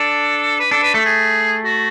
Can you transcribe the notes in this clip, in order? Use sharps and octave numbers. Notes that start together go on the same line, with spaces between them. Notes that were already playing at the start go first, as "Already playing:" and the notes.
Already playing: D4 A4
B4
D4 A4
B4
A3 A4
G#4
F#4